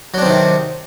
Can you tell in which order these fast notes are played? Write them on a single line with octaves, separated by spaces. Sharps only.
F#3 D4 C4 D#3 C3